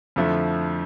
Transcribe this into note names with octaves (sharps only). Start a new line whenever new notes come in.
F2 D3 F3 A3 E4